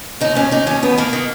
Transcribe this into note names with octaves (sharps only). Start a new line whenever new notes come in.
D#2 D#4
D#2 C#4
D#2 D#4
D#2 C#4
D#3 B3
D#3 A#3
D#3